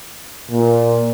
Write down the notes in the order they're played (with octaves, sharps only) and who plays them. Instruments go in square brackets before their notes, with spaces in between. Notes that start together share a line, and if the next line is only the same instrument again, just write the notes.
[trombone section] A#2